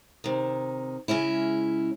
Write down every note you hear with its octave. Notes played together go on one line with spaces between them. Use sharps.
C3 D#3
C#3 G#3 C#4 E4